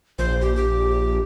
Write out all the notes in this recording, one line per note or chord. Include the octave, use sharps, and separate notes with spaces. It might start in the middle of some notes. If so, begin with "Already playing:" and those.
A#1 C5
G4
G4